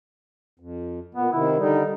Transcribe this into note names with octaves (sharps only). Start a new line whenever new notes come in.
F2
A#2 B3
C3 D#3 E4
D3 G3 D#4